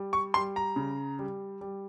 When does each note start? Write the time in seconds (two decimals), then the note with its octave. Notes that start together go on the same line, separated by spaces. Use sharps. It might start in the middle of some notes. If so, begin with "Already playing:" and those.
Already playing: G3
0.13 C#6
0.34 G3 C6
0.56 A#5
0.76 C#3
1.19 G3
1.61 G3